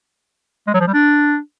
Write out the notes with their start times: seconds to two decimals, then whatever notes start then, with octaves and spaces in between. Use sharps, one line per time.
0.67 G#3
0.74 F#3
0.81 F3
0.87 G3
0.94 D4